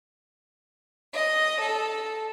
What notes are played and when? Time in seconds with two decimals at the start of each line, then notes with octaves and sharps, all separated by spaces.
1.13 D#5
1.61 A4